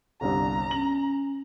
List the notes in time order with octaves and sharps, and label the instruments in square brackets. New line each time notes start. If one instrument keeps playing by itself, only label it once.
[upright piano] G1 C2 G2 [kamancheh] A#5
[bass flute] C#4 [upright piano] F#7